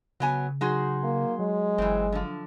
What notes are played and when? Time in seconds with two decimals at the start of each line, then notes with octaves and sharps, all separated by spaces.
0.20 C#3 F#3 B3 G#5
0.61 F#3 D#4 F#4 G#4 C6
1.03 A#3
1.39 F#3 G#3
1.78 G1 E3 C4
2.12 D3 F3